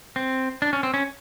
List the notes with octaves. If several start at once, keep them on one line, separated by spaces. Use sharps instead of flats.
C4
D4
C#4
C4
C#4